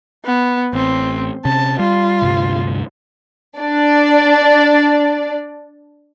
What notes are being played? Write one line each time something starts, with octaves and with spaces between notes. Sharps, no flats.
B3
A1 C4
C3 C#4 A5
G3 F4
D2 G2 C3
D4 D5